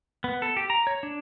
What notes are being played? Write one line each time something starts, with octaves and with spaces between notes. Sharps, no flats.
B3
A4
G4
A#5
C#5
D4